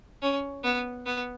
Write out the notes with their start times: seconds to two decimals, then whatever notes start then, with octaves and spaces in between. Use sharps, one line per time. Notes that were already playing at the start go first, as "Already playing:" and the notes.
0.22 C#4
0.64 B3
1.06 B3